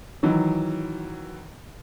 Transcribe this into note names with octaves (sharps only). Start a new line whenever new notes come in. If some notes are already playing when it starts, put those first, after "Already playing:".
D#3 E3 F#3